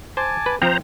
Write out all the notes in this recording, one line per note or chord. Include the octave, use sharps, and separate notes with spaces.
C5 G#5 A5 D6
B4
F3 C4 C5 A#5